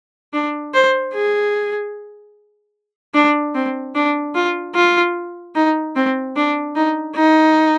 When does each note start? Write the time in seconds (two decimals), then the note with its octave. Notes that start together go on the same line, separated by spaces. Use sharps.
0.33 D4
0.74 C5
1.14 G#4
3.14 D4
3.55 C4
3.95 D4
4.35 F4
4.75 F4
5.55 D#4
5.96 C4
6.36 D4
6.75 D#4
7.15 D#4